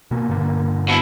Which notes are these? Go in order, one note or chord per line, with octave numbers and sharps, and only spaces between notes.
B2 A#3
G2 D3 A#3
B2 E4